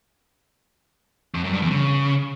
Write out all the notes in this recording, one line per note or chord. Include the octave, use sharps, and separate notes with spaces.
F2
F#2
G2
E2
C#3